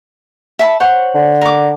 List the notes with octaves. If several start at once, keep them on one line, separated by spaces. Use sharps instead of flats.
E5 A5 B5
C5 C#5 F#5
D3
A#4 D6